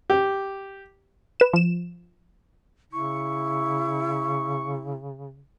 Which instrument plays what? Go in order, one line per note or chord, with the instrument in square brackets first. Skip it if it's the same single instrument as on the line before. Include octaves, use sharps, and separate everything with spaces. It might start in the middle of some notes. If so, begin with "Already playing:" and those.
[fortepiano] G4
[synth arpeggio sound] B4 E7
F3 E7
[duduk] C#3 [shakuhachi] E4 [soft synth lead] C#6